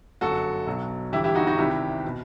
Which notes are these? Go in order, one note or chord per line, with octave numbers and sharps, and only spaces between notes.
G1 F#2 F#3 F#4 A4
B1 B2 F#3
G1 G2 E3 E4 G4
E4 G4
D#4 F#4
D#4 F#4
C2 C3 D#3 G3 E4 G4
B2